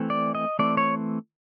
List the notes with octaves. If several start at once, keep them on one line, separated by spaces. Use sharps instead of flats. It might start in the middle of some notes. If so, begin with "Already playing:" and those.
Already playing: E3 A3 C4
D5
D#5
E3 A3 C4 D5
C#5